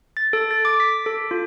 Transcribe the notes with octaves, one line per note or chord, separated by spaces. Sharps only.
A6
A4
A6
D6
B6
A4
F4